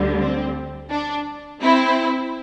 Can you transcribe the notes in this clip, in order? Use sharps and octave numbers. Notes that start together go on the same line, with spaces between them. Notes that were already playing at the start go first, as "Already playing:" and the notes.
Already playing: D2 D3 G3
C4
D4
C4 E4